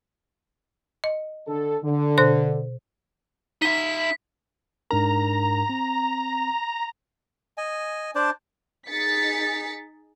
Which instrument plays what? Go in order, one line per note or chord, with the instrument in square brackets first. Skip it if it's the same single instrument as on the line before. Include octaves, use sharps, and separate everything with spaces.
[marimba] D#5
[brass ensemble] D3 A4
D3
[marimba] B2 C5 F#6
[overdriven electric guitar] D#4 E5 [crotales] B6
[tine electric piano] G#2 D4 A#4 [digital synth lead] A#5
[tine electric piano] C4
[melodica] D#5 G#5
D4 C5 D5 A5
[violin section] D#4 G#4 A6 B6 C#7